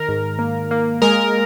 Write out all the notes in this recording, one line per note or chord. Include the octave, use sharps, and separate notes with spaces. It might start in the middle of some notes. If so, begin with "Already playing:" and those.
Already playing: D#3 A#4
G#2
A#3
A#3
G#3 A#4